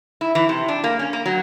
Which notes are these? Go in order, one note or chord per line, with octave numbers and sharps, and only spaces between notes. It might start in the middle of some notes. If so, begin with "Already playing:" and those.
E4
E3
C3
D4
A#3
C#4
A#3
F#3